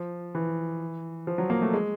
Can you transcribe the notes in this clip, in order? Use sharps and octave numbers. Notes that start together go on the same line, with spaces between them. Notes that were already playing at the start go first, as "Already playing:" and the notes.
Already playing: F3
E3
F3
F#3
A#3
A3
G#3